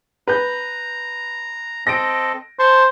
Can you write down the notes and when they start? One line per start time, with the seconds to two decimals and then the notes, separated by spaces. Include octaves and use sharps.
0.27 B4 A#5 G6
1.87 C4 A4 D#5 A#6 D7
2.59 C5 A5 C6 C#6